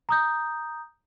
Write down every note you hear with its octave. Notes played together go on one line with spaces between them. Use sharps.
A#5 D#6 G6